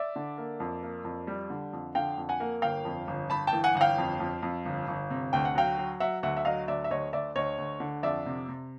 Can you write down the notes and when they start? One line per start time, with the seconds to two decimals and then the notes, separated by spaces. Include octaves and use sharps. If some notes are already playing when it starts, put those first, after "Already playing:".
Already playing: D5 E5
0.16 D3
0.38 A#3
0.60 F2
0.83 A#3
1.05 F2
1.27 G3
1.50 D3
1.73 F2
1.95 D3 F5 G5
2.18 F2
2.29 F#5 G#5
2.40 A#3
2.62 G1 F5 G5
2.85 F2
3.07 G1
3.30 G1 A5 B5
3.47 G5 A5
3.53 E3
3.64 F#5 G#5
3.75 G1 F#5
3.81 F5 G5
3.98 F2
4.20 F2
4.43 F2
4.65 G1
4.88 G1
5.10 C3
5.33 D2 G5
5.45 F#5
5.55 F#3 F5 G5
5.78 F#3
6.00 F#3 E5 F#5
6.23 D2 E5 F#5
6.37 E5
6.45 F#3 D#5 F5
6.68 D2 D5 E5
6.84 E5
6.90 D2 C#5 D#5
7.13 D2 D5 E5
7.36 D2 C#5 D#5
7.58 D2
7.80 D3
8.03 F2 D5 E5
8.26 C3
8.48 C3